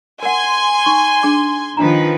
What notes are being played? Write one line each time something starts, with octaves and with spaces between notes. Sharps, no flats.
A#4 F#5 G#5 C6
D#4 C#6
D4 G#4 D6
D#3 F3 D4 B4 A#5